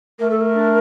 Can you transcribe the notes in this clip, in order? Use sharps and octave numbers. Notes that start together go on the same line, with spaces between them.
A3 A#4
A4
A#4
D4